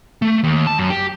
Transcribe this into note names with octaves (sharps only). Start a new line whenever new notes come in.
A3
D#2
A5
F#2
G4